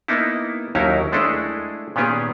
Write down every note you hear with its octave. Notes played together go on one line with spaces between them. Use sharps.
A#3 B3 D#4 E4
D#2 F#3 C#4 D#4 E4 A#4
G#3 A3 D4 E4 G#4 A4
A#2 D#3 B3 C#4 G4 G#4